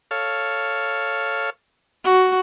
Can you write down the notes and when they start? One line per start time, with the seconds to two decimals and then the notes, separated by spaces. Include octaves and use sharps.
0.11 A4 C#5 F5
2.05 F#4